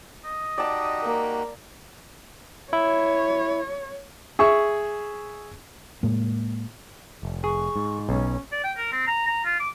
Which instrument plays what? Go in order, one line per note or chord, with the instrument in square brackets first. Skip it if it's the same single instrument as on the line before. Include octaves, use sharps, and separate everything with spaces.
[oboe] D#5
[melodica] D#4 F#4 G4 [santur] D5 A5 D#6
[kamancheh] A#3
[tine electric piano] E4 [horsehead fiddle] C#5
[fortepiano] G#4 E5 C#6
[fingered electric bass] A2 G#3 A#3
[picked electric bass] F1
[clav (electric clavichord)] G#4 [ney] C#6
[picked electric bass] G#2
[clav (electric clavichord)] B1 [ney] C#4
[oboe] D5
G5
A#4
C4
A#5
A#5
F4
D6